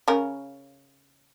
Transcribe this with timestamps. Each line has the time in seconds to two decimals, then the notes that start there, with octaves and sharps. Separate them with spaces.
0.08 C#3 C#4 A#4